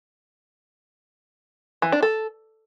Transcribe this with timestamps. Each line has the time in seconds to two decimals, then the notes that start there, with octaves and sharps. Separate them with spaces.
1.82 E3
1.92 D4
2.02 A4